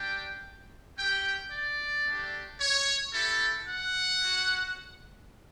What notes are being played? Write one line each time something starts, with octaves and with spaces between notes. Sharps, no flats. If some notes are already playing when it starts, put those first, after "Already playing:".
Already playing: G3 D4 G4 G5
C#4 G4 G5
D5
A3 D4 G4
C#5
C#4 E4 G4 A4
F#5
C#4 F#4